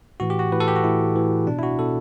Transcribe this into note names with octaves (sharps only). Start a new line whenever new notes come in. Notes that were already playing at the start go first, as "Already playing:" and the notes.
A2 E3 F#4
G4
F#4
A2 E3 B4
A4
G4
F#4
A2 E3 E4
A2 E3
B2 D4
E4
F#4
B2 A4